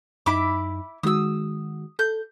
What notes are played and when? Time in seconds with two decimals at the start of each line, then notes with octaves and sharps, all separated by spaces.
0.26 F#2 D#4 E4 B5 D6
1.03 D#3 G#3 F#4 D#6 E6
1.99 A4 G6